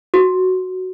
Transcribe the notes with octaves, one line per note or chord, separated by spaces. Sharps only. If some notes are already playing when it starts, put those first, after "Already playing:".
F#4